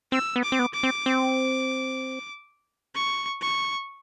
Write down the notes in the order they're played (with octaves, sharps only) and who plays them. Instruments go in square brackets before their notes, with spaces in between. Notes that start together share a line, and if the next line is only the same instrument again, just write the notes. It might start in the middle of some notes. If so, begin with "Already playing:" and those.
[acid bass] C4 [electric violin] E6
[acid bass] B3
[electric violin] D6
[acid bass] C4
B3
[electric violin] D6
[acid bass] C4
C4
[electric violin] C#6
C#6